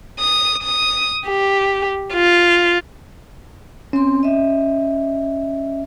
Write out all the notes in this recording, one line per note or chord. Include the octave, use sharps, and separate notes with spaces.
D#6
D#6
G4
F4
C4 C#4 C6
D#5 E5